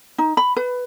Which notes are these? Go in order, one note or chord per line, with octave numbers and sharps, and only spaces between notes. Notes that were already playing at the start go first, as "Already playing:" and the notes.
D#4
B5
B4